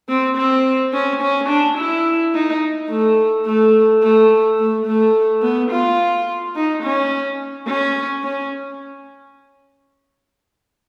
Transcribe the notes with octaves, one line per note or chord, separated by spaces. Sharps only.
C4
C4
C#4
C#4
D4
E4
D#4
A3
A3
A3
A3
A3
B3
F4
D#4
C#4
C#4
C#4